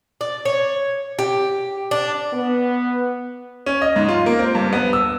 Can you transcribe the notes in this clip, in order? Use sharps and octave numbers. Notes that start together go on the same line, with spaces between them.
D5
C#5
G4
D4
B3
C#4
D#5
G#2
F4
A#3
C4
G2
B3
E6